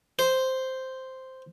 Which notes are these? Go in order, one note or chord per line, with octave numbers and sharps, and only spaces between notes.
C5